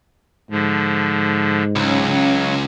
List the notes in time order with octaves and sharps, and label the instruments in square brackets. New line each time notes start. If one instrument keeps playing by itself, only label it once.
[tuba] G#2 [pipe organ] D3 F3
[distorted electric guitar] C#2 [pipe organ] F#3 [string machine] C#4